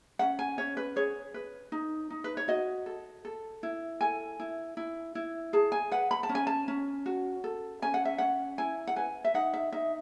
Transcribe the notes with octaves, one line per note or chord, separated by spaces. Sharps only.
C#4 F#5
G#5
C#4 C#5
B4
G#4 C#5
B4
D#4
D#4
B4
C#5
F#4 D#5
A4
A4
E4
A4 G#5
E4
E4
E4
G#4 A5
G#5
B4 F#5
B5
A5
C#4
G#5
A5
C#4
F#4
A4
C#4 G#5
F#5
E5
C#4 F#5
E4 G#5
F#5
B4 G#5
E5
D#4 F#5
E5
D#4 E5